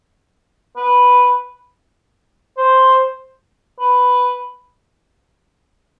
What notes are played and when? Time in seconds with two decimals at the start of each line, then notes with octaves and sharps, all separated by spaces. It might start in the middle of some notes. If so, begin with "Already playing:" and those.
0.77 B4
2.57 C5
3.79 B4